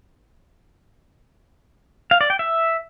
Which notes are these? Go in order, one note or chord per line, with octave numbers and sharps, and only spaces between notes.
F5
D5
G5
E5